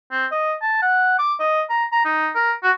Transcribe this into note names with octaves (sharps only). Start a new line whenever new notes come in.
C4
D#5
A5
F#5
D6
D#5
A#5
A#5
D#4
A#4
F#4